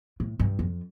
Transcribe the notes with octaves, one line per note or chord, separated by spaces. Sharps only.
A2
G2
F2